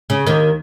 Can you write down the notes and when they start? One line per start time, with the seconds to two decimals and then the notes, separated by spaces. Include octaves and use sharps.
0.10 C#3
0.27 D#2 D#3